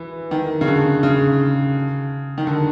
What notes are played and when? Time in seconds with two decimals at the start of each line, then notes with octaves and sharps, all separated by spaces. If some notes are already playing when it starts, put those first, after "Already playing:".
Already playing: E3
0.31 D#3
0.61 C#3
0.67 D3
1.03 C#3
2.38 D#3
2.47 D3